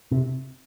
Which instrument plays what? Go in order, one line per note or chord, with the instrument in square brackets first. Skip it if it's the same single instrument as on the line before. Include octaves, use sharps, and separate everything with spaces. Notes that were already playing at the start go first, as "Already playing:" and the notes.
[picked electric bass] C3